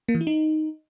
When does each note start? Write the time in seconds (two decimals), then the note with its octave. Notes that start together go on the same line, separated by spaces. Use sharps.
0.09 A#3
0.15 E3
0.21 E4
0.27 D#4